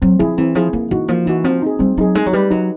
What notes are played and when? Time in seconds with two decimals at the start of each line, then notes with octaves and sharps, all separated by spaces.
0.02 F#3 C4
0.19 F3 E4 G#4
0.38 E3 C4
0.55 F3 E4 G#4
0.73 E3 A#3
0.91 E3 D#4 F#4
1.08 F3 A#3
1.26 E3 D#4 F#4
1.44 F3 C4
1.62 D#4 G#4
1.79 G3 C4
1.97 F#3 D#4 G#4
2.15 G#3 D#4
2.26 F#3
2.33 G3 G4 B4
2.50 F#3 D#4